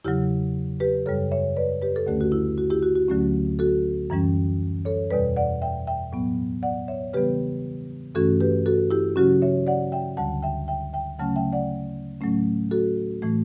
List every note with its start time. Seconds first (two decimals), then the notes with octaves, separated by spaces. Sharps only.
0.04 E2 C#3 F#3 E4 G4
0.80 G4 B4
1.06 F#2 C#3 G3 A4 C#5
1.31 C#5 E5
1.56 B4 D5
1.82 G4 B4
1.96 A4
2.07 D2 D3 A3 C#4 G4
2.21 F#4
2.32 E4
2.58 F#4
2.70 E4 G4
2.83 F#4
2.96 F#4
3.08 D2 D3 F#3 A3 C#4
3.59 F#4 A4
4.10 F#2 E3 G3 C#4
4.85 A4 C#5
5.10 E2 B2 G3 B4 D5
5.37 D5 F#5
5.62 E5 G5
5.87 E5 G5
6.12 A2 F#3 B3
6.62 D5 F#5
6.88 C#5 E5
7.13 C#3 E3 G3 B3 G4 B4
8.15 G2 E3 A3 C#4 F#4 A4
8.41 G4 B4
8.66 F#4 A4
8.91 E4 G4
9.16 C#3 F#3 C#4 F#4
9.42 C#5 E5
9.67 D5 F#5
9.92 E5 G5
10.17 D2 D3 G3 F#5 A5
10.43 E5 G5
10.68 E5 G5
10.93 E5 G5
11.19 C#3 F#3 A3 C#4 F#5 A5
11.36 E5 G5
11.53 D5 F#5
12.21 A2 F#3 A3 C#4
12.71 F#4 A4
13.22 A2 E3 A3